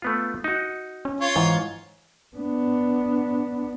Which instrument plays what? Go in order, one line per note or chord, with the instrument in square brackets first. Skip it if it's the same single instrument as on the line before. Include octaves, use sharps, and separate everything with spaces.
[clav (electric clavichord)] A3 B3 F4
D#4 F#4
[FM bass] C#4
[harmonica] F4 C#5
[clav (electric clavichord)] G#2 [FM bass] E3
[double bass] B3 D4